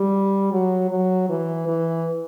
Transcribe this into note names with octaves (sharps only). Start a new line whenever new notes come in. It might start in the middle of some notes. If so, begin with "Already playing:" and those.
Already playing: G3
F#3
F#3
E3
E3